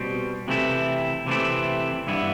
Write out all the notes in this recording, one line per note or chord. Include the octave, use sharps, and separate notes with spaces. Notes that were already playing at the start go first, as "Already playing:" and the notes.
Already playing: B2 G3 C4
C3 E3 A3 C4 E4
C3 E3 A3 C4 E4
G2 E3 B3 E4